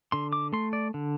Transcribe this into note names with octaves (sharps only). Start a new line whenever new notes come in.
D3 C6
D6
A3 C6
D5
D3